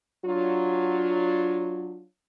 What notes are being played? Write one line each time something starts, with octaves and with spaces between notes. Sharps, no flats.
F#3 D4 F4